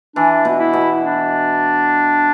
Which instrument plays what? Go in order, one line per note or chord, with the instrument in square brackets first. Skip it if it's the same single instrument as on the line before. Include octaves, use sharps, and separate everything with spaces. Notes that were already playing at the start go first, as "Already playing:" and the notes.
[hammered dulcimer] E3 [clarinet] D4
[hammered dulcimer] B2
[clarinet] E4
[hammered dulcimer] B2
[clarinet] D4